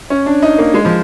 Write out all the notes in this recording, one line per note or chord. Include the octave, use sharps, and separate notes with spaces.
C#4
D4
D#4
A#3
G#3
F3